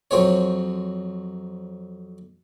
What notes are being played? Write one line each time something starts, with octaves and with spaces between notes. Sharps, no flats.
F2 F#3 C4 G#4 C#5